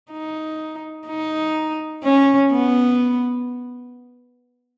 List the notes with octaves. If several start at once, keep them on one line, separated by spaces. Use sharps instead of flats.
D#4
D#4
C#4
B3